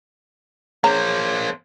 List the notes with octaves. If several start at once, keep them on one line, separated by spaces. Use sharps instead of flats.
A#3 G#4 C5 C#5 A#5